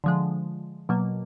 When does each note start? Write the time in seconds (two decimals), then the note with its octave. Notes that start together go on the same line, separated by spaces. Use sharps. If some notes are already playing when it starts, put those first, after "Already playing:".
0.04 D3 F3 G#3
0.89 B2 F#3 A#3